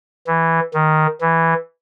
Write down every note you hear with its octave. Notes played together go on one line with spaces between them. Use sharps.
E3
D#3
E3